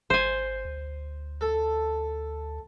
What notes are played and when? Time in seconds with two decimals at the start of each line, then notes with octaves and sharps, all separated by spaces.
0.10 G#1 C5 G#5
0.65 D2
1.41 A4